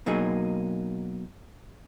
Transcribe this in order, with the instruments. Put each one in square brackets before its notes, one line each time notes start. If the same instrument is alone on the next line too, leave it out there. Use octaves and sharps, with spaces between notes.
[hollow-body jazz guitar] B2 F#3 A#3 D#4 G#4